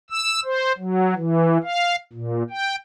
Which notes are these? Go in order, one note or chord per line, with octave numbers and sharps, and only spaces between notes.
E6
C5
F#3
E3
F5
A#2
G5